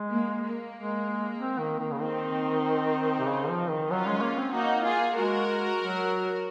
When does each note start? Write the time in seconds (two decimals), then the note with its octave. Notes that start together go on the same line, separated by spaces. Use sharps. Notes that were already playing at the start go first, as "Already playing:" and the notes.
Already playing: G#3
0.11 A#3
0.43 A#3
0.74 G#3
1.37 C4
1.59 D#3
1.79 D#3
1.91 C#3
2.01 D#3 C4 D#4
3.20 C3
3.27 C#3
3.49 F3
3.70 D#3
3.90 F#3 C#4 F4
4.06 G#3
4.18 G#3
4.22 A#3
4.38 C4
4.53 A#3 D#4 F#4
4.85 F4 G#4
5.17 G#3 F#4 A#4
5.80 F#3